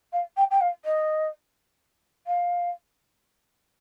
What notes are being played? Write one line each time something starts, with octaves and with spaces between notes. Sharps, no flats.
F5
G5
G5
F5
D#5
F5